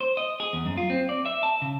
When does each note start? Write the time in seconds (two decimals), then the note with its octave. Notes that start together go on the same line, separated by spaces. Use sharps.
0.01 C5
0.17 D#5
0.40 G#4
0.53 E2
0.66 F#2
0.77 F4
0.90 C4
1.09 D5
1.26 E5
1.43 A5
1.62 C#3